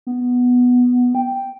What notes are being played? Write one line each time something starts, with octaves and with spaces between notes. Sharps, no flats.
B3
G5